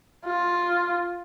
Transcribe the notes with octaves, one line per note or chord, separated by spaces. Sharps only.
F4